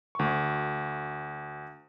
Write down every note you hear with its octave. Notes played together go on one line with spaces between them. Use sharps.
D2 C#6